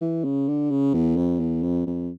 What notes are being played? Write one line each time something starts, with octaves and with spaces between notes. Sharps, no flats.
E3
C#3
D3
C#3
E2
F2
E2
F2
F2